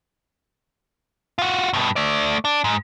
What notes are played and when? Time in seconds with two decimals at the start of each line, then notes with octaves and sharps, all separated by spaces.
1.39 F4 F#4
1.73 G2 B2
1.96 A3 D5
2.45 D4
2.64 G#2